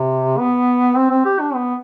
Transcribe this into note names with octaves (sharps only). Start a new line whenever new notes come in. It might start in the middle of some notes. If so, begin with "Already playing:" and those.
Already playing: C3
B3
C4
C4
G4
D4
B3